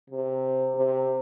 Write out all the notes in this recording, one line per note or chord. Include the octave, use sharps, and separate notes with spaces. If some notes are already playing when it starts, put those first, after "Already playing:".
C3
C3